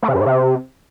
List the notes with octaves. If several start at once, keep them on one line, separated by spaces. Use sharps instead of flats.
A3
C3
F#2
G#2
C3